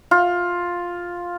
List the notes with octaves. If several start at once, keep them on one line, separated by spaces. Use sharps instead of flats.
F4